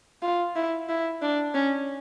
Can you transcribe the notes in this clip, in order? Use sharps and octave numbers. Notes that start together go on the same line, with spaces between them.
F4
E4
E4
D4
C#4